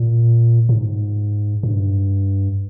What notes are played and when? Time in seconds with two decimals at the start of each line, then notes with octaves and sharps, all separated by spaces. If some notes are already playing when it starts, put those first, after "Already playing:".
Already playing: A#2
0.69 G#2
1.63 G2